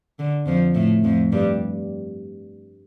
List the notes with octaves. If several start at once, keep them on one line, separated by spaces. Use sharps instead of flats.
D3
F2 F3
A2 A3
F2 F3
G2 G3